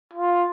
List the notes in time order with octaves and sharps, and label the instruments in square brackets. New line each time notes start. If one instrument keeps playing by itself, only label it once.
[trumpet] F4